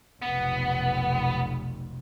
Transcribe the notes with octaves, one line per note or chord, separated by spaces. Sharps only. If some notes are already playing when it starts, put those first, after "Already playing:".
F1 B1 B3